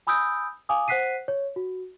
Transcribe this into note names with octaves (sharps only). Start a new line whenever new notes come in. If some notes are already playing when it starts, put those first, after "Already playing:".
G#5 B5 D#6 E6 G6 D7
F5 G#5 D6 D#6
C5 F#5 F#6 B6 C7 D#7
C#5
F#4